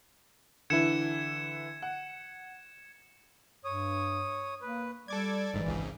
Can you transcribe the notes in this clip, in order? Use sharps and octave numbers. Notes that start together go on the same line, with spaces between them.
D3 E3 E4 G#6 C#7 E7
F#5
G2 C#5 D#6
A#3 B4
G3 A4 D5 D6 G#6
G1 G#2 E3
G#1 C#2 G#2